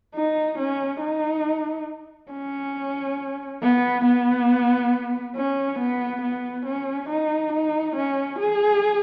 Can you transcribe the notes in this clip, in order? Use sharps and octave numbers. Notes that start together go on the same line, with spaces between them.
D#4
C#4
D#4
C#4
B3
B3
C#4
B3
B3
C#4
D#4
D#4
C#4
G#4